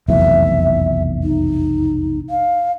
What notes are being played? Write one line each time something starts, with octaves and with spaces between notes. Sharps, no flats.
F1 B1 E2 E5
D#4
F5